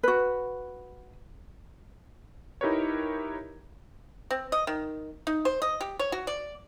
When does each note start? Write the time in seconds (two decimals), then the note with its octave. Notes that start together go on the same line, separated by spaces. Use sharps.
0.03 F#4 B4
2.61 D#4 E4 G4 A#4 B4 C#5
4.31 C4
4.52 D#5
4.67 D#3
5.27 D#4
5.45 C5
5.62 D#5
5.81 G4
5.99 C#5
6.12 F#4
6.27 D5